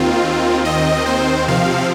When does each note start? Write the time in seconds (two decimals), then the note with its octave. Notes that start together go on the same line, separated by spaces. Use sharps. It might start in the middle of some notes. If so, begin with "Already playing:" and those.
Already playing: D#2 D#3 C4 F4
0.65 D#5
1.06 C5
1.48 C3 F3 C4 F5